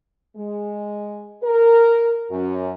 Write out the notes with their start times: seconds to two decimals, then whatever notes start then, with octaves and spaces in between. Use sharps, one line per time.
0.36 G#3
1.43 A#4
2.30 F#2